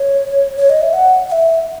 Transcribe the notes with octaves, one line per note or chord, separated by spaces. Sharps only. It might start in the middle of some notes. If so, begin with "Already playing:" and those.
Already playing: C#5
C#5
D#5
E5
F#5
F#5
E5